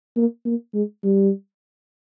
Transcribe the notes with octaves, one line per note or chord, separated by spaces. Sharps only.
A#3
A#3
G#3
G3